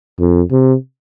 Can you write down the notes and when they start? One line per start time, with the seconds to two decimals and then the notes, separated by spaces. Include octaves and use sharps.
0.19 F2
0.51 C3